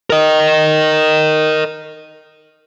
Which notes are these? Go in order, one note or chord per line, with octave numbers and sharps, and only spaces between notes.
A#4 D#5